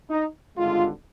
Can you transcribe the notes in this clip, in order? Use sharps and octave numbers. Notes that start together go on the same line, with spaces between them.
D#4
G#1 G2 D3 G#3 F4